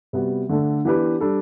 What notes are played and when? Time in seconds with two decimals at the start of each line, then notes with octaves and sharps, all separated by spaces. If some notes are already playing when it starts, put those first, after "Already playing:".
0.13 C3 G3 B3 F#4
0.49 D3 A3 D4 A4
0.85 E3 B3 D4 G4 B4
1.21 G3 D4 A4